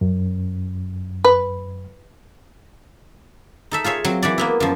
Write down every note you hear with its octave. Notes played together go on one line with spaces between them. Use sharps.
F#2
B4
D#4 A4 E5
F4 G#4 C#5 E5
F#3 C4
E3 F#4 D5
A#3 B3 E4
F#2 F3